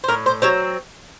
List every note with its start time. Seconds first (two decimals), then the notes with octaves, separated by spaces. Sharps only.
0.04 C5
0.08 A2 A#4
0.26 C5
0.42 F#3 C4 C#5